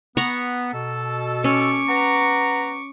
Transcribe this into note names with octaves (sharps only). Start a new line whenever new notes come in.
B3 F#5 A#5 C#6
B2 A4
C#4 C#6 D6
B4 F#5 A#5